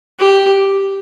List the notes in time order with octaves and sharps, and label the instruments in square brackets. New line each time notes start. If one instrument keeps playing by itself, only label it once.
[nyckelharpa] G4